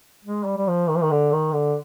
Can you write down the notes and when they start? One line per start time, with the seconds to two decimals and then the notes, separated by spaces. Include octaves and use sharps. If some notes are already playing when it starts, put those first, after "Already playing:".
0.25 G#3
0.45 G3
0.58 G3
0.68 F3
0.89 D#3
0.96 F3
1.03 D#3
1.11 D3
1.32 D#3
1.54 D3